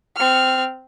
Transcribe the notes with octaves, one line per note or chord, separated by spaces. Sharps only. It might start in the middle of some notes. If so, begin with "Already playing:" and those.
C4 F6